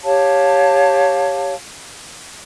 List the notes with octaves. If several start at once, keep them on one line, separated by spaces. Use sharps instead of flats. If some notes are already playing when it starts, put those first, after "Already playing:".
G4 C#5 F5 A5